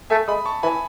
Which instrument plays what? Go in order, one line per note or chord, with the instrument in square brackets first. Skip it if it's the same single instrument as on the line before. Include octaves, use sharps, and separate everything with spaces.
[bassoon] A3 [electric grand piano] E5 G#5
[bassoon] G#3 [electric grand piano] B5 D#6
[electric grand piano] A5 C#6
[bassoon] E3 [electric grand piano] G#5 B5